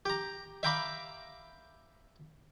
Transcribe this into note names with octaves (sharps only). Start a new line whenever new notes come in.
G4 A#5
E5 F5 G5 A#5 B5 D6